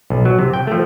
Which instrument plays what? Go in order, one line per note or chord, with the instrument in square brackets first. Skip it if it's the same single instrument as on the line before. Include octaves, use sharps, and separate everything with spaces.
[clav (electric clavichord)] B1
F#3
C3
G5
F3 A3